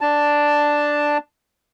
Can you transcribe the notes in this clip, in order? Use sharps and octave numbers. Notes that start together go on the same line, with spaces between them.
D4 A5